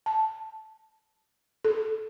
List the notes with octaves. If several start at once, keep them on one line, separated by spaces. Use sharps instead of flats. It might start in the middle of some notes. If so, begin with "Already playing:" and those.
A5
A4